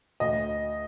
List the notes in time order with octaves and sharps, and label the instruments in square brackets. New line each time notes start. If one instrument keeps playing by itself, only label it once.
[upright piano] D2 D#5